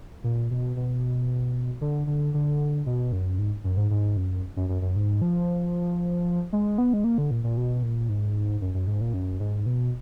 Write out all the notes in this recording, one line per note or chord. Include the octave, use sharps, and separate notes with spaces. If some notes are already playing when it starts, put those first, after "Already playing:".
A#2
B2
B2
D3
D3
D3
B2
F#2
G#2
F#2
G#2
G#2
F#2
F#2
F#2
F#2
G#2
F3
G#3
B3
G#3
A#3
D3
A#2
A#2
B2
A#2
G#2
F#2
F#2
G#2
A#2
F#2
G#2
B2